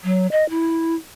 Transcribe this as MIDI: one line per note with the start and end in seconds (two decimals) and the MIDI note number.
0.04 0.27 54
0.32 0.47 75
0.50 0.95 64